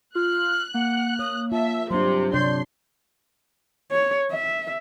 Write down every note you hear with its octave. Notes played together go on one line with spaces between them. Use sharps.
F4 F6 F#6
A#3 F#5
C#5 D#6
F4 E5 A5
G2 C3 F#3 D4 C6
C3 D4 C#5 D5 C6 G6
C#5
E5